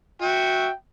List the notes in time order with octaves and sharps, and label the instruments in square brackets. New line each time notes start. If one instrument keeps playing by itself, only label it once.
[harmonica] F#4 E5 [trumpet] G5